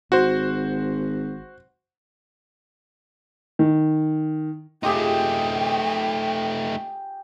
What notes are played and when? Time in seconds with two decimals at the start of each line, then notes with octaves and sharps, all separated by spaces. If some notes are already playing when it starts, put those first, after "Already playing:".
0.12 G#1 F#4 C5
3.59 D#3
4.83 A3 D#4 F4 G4 G#4 G5